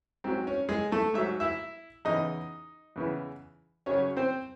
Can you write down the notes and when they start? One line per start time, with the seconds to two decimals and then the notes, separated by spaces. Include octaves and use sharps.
0.24 G#2 F#3 C4
0.47 C#4
0.69 G#3 G#4
0.92 A3 A4
1.14 G#2 F#3 E5
1.40 E4 E5
2.05 E2 C#3 E3 D#4 D#5
2.96 E2 C#3 E3
3.86 F#2 C#3 F#3 C#4 C#5
4.17 C4 C5